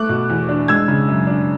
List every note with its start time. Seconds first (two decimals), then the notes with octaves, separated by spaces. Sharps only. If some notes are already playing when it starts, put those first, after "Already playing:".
Already playing: A3 D6 F#6
0.09 B2
0.30 E2
0.49 D4
0.68 G#3 E6 G#6
0.88 C#3
1.08 F#2
1.27 D4